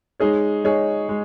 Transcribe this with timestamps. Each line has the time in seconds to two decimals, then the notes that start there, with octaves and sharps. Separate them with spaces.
0.20 G#3 D#4 G#4 C#5
0.64 G#3 D#4 G#4 C#5
1.09 G#3